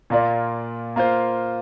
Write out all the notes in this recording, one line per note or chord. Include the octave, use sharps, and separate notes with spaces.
A#2 A#3 F4 D5
A#3 F4 C5